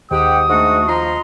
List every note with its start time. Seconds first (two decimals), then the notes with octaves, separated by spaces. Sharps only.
0.11 D#2 G#2 G4 F#5 G5 D#6
0.49 G#2 A3 D4 F#4
0.88 F3 D#5 A#5 C6